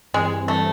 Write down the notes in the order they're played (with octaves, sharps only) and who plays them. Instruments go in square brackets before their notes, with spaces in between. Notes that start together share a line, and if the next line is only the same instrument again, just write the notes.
[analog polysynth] G2 E3 G3 C4 [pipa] G#3
[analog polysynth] E3 G3 C4 [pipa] A3